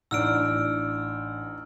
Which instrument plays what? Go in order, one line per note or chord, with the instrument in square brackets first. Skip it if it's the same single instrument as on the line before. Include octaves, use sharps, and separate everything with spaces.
[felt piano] A1 [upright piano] D4 D#4 [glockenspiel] E6 F6 D7